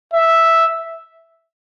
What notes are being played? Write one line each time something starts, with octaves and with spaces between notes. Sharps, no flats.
E5